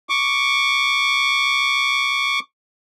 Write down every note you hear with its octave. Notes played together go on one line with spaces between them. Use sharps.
C#6 D6